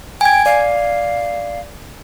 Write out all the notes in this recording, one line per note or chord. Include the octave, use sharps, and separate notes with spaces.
G5 G#5 G#6
D5 F5